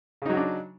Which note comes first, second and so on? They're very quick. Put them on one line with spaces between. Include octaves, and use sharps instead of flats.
C#3 D#4 F#3 F#4 D4